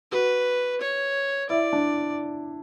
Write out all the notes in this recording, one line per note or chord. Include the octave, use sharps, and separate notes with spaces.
F#4 B4
C#5
E4 D5
D4